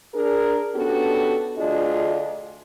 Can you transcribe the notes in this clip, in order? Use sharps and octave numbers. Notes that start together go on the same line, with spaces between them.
D4 G#4 A#4
B3 C#4 D4 F#4 G4 A4
D2 D4 F4 G#4 D#5